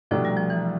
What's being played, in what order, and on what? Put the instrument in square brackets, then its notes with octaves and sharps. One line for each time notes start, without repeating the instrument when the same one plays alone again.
[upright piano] C2 B2 A3 D4 G4 [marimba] F3
[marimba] G3
F3
E3